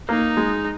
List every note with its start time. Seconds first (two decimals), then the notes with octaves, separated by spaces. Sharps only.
0.09 A#3 D#4
0.37 G#3